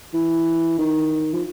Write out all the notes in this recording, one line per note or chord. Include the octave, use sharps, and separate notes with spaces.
E3
D#3
F3